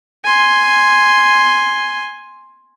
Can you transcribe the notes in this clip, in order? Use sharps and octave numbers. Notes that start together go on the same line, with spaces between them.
G#5 C6